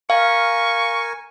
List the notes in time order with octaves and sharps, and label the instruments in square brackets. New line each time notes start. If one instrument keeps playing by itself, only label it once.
[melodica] A#4 G#5 [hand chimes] F5 [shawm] C#6